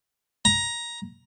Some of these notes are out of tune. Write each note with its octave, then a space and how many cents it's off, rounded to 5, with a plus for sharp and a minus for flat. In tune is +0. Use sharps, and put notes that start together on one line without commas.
A#5 +15